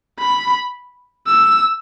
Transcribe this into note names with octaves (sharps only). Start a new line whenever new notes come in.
B5
E6